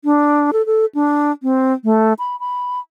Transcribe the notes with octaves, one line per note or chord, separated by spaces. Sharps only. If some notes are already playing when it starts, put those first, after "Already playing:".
D4
A4
A4
D4
C4
A3
B5
B5